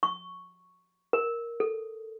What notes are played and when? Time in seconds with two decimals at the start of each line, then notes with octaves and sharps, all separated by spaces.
0.03 C#6
1.13 A#4
1.60 A4